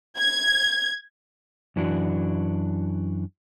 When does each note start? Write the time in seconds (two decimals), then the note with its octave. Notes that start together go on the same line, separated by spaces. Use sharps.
0.18 G#6
1.76 F#2 E3 D4 F#4